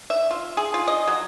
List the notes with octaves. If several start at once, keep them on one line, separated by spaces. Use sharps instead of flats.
E5
F4
G#4
F4
D#5
F#3